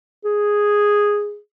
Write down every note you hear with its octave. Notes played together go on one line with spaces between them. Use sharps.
G#4